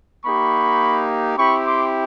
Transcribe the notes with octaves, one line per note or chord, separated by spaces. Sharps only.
A#3 D#4 G4 B5 C#6
C4 E4 G4 B5 C#6
C6 D6